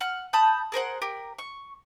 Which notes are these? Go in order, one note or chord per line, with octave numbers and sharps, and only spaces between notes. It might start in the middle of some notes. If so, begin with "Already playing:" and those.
F#5 F6
A5 B5 D#6 G6
G#4 A#4 C5 F#5
G4 A#4
C#6